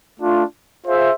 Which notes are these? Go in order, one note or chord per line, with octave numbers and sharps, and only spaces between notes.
A3 D4 F4
F4 G#4 C5 E5